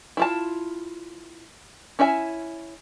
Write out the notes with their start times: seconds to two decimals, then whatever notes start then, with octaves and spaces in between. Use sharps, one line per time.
0.17 E4 F4 A5
1.99 C#4 E4 E5 G#5